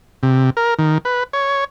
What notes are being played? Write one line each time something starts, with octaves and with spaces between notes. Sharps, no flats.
C3
A#4
D#3
B4
C#5